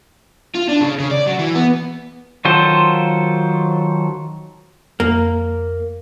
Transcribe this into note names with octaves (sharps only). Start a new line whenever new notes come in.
F4
D4
C#3
C#3
D5
F#3
E3
B3
D#3 F#3 F4 A4 C5
F2 A#3